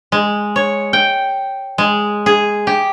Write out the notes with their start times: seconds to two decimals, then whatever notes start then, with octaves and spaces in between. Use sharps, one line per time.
0.12 G#3
0.56 C#5
0.93 G5
1.78 G#3
2.26 G#4
2.67 G4